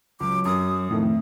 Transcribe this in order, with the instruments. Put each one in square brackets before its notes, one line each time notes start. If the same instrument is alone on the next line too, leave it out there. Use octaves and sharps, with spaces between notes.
[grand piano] C#2 [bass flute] F#3 [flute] D6
[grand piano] F#2 [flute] D#6
[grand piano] F2 [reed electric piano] A2 D#3 [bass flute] A3